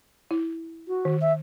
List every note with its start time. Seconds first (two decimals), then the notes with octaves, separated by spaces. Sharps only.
0.31 E4
0.88 F#4
1.05 D#3
1.21 E5